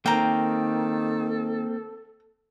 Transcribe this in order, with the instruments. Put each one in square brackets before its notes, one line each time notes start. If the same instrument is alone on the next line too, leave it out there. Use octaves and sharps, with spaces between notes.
[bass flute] D#3 [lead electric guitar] A#3 C4 [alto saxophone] A4 [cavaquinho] G5 A#5